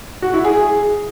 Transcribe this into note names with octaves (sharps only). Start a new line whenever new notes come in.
F#4
E4
G#4